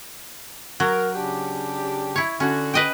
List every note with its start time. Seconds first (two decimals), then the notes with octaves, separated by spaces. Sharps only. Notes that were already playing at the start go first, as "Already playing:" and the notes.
0.80 F#3 A#4
1.15 C#3 D4 G4
2.16 E4 C#5
2.40 D3 C#4 F#4
2.74 B4 D#5 G5